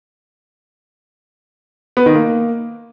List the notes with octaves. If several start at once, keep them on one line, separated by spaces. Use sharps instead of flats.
B3
D#3
A#3